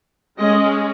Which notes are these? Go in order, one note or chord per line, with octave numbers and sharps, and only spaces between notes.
G#3 C#4 D#5